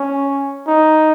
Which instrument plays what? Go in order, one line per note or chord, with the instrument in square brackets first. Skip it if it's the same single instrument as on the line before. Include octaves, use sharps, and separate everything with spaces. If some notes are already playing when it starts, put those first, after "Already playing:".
Already playing: [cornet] C#4
D#4